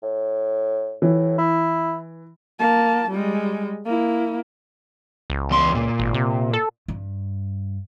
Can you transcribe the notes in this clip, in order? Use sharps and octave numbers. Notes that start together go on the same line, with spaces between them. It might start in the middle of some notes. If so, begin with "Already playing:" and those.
A2
A2 E3
E4
A#3 A5
G3 G#3
A#3 E4
C#2
E2 C6
A#2
G#1
C3
A4
G2